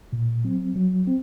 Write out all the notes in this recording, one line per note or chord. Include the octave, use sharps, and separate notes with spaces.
A#2
F#3 C4
F#3
C4